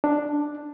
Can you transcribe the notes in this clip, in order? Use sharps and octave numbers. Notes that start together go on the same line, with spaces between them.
D4